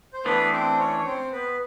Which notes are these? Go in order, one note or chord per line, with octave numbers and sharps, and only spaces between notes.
C5
E3 A3 B3 D4 B4
C4 C5
C#4 C#5
C#5
C4 C5
B3 B4